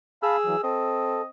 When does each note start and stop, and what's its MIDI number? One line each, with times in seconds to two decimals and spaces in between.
0.23 0.59 68
0.23 0.37 77
0.23 0.37 81
0.23 0.37 83
0.23 0.59 88
0.45 0.57 52
0.45 0.57 54
0.63 1.27 60
0.63 1.22 69
0.63 1.27 75